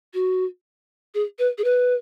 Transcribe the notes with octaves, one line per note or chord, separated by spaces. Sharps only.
F#4
G#4
B4
G#4
B4